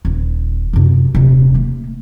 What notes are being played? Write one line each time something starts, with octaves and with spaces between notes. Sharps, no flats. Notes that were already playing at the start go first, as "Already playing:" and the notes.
D#1
F#2 C3
D#1 C3
A3 A#3